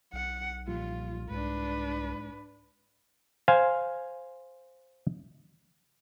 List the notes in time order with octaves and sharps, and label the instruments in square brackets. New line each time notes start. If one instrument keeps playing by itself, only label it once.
[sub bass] B1 [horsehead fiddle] F#5
[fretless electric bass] A#2 F3 G3 [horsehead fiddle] F4
[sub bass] C2 [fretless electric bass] G#2 [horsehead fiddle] D4 B4
[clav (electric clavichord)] C5 F5 G#5